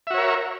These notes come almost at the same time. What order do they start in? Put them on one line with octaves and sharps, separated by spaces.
E5 F#4 C#5 A#4